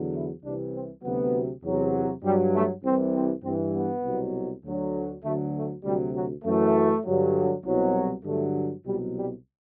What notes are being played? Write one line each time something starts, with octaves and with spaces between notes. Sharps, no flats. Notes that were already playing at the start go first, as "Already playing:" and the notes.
Already playing: E2 D3 F#3
E4
C2 C3 E3 D4
C4
D2 C3 F#3 B3
E2 C3 F#3
G2 F#3 G3
A3
C2 C3 E3 C4
C4
G2 E3 C4
B3
C2 B2 F#3
D2 D3 F#3
D2 D3 F#3 A3
A3
D2 C3 F#3 G3
F#3
F#2 E3 A3
G2 D3 F#3
C2 B2 F#3
G2 D3 F#3 A3
C2 B2 F#3 G3
G3